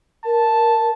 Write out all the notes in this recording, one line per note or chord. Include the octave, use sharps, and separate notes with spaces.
A#4 A5